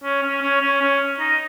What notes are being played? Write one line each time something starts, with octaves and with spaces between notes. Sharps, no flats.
C#4
C#4
C#4
C#4
C#4
D#4